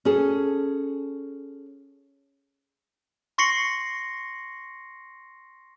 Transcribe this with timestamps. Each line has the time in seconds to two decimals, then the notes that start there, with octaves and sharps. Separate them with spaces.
0.05 C#4 G#4 A4
3.38 C6 C#6 A#6 C7 C#7 F#7